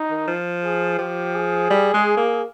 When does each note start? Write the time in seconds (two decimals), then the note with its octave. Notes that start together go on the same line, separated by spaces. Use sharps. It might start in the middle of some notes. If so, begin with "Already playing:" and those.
Already playing: D#4
0.10 D#3
0.28 F3
0.64 G#4
0.99 F3 G4
1.35 G#4
1.70 G3
1.94 G#3
2.17 A#3